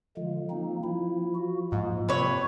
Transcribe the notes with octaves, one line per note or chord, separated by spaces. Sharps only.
D3 F3 G#3
A#3 C4 D#4
F3 E4
F#4
G#2 A#3
C3 B4 C#5